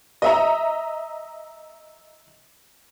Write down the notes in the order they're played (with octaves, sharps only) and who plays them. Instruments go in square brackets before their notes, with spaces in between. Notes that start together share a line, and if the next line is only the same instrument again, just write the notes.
[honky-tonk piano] D#5 E5 A#5